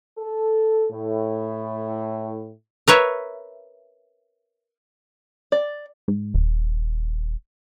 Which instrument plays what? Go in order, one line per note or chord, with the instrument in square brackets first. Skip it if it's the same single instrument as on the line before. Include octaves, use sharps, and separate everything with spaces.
[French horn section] A4
A2
[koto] A#4 B4 C#5 E5
[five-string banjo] D5
[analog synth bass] G#2
D#1